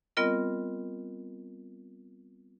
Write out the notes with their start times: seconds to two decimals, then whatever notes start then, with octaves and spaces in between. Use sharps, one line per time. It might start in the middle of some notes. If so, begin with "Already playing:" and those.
0.17 G3 B3 C4 F4 A#4 D#5